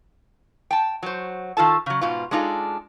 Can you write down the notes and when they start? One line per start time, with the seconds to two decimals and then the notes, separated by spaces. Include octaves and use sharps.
0.71 G5 A5
1.03 F#3 C5
1.57 D#3 F4 A4 A5
1.86 C#3 F#3
2.01 G#2 B2 F4
2.31 G#3 D4 D#4 F4 A4